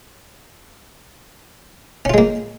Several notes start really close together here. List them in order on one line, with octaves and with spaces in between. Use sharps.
C#4 F4 G#3 A#3